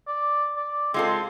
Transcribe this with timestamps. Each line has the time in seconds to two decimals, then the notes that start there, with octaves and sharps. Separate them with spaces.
0.08 D5
0.56 D5
0.94 G#3 C4 F4 A4